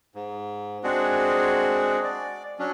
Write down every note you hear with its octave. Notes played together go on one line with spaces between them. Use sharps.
G#2
G#3 C4 D4 F#4 G#4
D5
F#3 C#4 D4